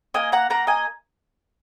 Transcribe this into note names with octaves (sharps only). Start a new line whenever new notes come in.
A#3 D#5 G#5
F#5 A#5
A#3 F#5 A#5
D#5 G#5